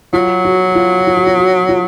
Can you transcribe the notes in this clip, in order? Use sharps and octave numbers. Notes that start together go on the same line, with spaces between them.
F#3 F4
F#4
F4
F4
F#4
F4
F#4
F4